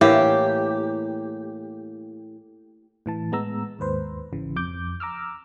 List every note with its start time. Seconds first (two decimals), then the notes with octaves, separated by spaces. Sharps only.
0.01 A2 E3 A#3 G4
3.06 A2 E3 A5
3.32 A2 G#3 B3 A#5 E6
3.79 D#2 G#2 B4 C5
4.33 G#1 C#3 E3
4.56 F2 D6 G6
5.00 A#5 D6 E6 F6